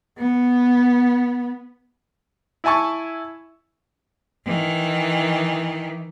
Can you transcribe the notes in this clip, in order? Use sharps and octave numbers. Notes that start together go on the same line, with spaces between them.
B3
E4 E5 G#5 A5 C#6
D#3 E3